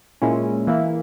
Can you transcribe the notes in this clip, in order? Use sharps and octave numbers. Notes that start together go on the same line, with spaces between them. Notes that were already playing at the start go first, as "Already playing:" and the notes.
A#2 G#3 C#4 E4
E3 A#3 E4